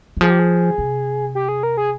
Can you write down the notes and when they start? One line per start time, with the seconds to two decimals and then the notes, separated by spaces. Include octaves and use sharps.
0.17 E3
0.21 F3 G#4
0.30 G4
0.39 G#4
0.78 C3
1.35 G4
1.49 G#4
1.63 A#4
1.77 G#4